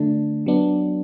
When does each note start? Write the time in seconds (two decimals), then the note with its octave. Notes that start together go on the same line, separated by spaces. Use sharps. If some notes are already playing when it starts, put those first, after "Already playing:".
Already playing: D3 A3 D4
0.46 F#3 B3 D4